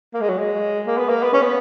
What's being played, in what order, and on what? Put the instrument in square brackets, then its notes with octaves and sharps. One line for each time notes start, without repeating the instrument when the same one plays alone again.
[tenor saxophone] A#3
G#3
F#3
G#3
A#3
B3
A#3
B3
C#4
B3